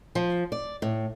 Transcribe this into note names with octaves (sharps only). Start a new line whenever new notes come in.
F3
D5
A2